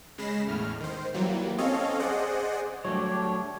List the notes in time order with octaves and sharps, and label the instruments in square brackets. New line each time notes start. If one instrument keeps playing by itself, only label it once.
[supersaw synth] C#3 G#3 B5 A#6 C7 E7
E2 A2 F6
D#3 C5
E3 F#3 G3 A#3
C4 C#4 A4 C#5 D#5 F5
G#4 C5 D5 D#5 F#5
[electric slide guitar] F#3 A3 [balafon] G3 [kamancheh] D4 G4 [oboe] C#5